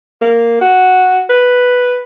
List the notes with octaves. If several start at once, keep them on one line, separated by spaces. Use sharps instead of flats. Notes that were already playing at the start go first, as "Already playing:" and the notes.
A#3
F#4
B4